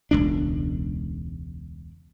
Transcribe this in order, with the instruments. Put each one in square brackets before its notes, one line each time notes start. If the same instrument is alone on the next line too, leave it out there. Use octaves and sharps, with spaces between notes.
[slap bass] E1 C#2 D4